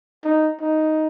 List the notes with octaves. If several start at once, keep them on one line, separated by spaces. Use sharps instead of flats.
D#4
D#4